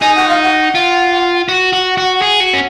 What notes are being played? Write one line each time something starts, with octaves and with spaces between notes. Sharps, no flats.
D#4 G#5
F#5
F5
F#5
F4
F#4 F#5
F#4
F#4
G#4
F#4
C#4